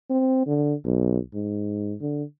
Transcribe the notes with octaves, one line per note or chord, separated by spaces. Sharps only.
C4
D3
B1
G#2
D3